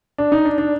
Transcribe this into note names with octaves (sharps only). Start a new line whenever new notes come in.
D4
D#4
D4
D4